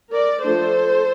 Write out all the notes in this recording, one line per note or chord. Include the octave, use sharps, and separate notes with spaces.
A#4 D5
F3 A3 D4 A4 C5